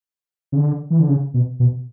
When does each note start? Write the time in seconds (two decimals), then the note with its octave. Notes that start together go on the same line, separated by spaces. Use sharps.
0.52 C#3
0.57 D3
0.90 E3
1.00 D3
1.09 C#3
1.34 B2
1.60 B2